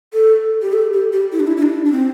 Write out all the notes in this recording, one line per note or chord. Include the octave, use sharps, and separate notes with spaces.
A4
G4
A4
G4
G4
E4
D4
E4
E4
D4
D4
C4